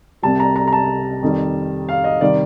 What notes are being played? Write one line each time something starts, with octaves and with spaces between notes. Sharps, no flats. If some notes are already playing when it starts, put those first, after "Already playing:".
C2 C3 G3 A5
A#5
A#5
A#5
A5
F2 D#3 G3
F5
D#5
C3 D#3 G3 D5